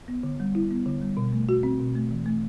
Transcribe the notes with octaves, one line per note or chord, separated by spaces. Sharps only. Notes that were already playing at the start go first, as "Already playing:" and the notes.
B3
D3
G3
E4
B3
D3
G3
B2
A3
F#4
C4
B2
A3
E3
A3